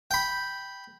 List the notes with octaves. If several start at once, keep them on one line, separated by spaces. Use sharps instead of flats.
G5 B5